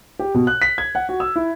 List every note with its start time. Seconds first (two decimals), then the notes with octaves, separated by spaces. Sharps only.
0.19 G4
0.34 B2
0.47 F#6
0.62 B6
0.78 G#6
0.95 F#5
1.09 F#4
1.20 E6
1.36 E4